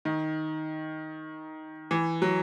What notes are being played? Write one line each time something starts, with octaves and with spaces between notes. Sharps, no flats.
D#3
E3
F#3